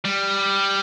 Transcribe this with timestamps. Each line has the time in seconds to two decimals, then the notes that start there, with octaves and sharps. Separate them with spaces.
0.05 G3